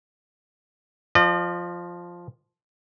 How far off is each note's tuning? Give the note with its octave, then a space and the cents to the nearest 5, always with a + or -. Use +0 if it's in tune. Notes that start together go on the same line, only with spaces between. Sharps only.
F3 +0 D#5 -45